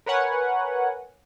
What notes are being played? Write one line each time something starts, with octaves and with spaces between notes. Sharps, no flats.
A#4 B4 C#5 F#5 G#5